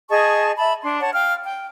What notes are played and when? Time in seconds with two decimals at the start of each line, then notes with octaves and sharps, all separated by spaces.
0.10 G#4 D#5 A5 C#6
0.58 E5 A5 B5
0.83 D4 C6
0.99 C#5 F#5 A5
1.13 F5 G5 F6
1.43 G5